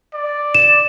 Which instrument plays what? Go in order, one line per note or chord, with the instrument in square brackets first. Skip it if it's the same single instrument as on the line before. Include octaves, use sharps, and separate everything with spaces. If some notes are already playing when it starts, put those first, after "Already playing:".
[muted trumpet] D5
[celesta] E7